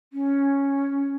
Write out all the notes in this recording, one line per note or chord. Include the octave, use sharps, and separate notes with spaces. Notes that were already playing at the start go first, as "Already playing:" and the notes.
C#4